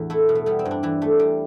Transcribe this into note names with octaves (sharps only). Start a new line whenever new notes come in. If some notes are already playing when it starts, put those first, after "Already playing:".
Already playing: E2 A2 D4
A3 E4
B2
A3
G3 B3
C4
G2
D4
E3 E4
A3
G3